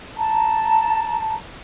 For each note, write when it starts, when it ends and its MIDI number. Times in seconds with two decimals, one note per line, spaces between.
0.17 1.35 81
0.17 1.35 82